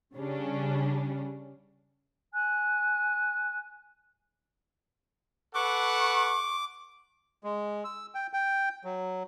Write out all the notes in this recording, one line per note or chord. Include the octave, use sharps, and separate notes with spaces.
C#3 G3 C#4 D4
G#5 F#6
A4 B4 F#5 C#6 D6
G#3
E6
G5
G5
F#3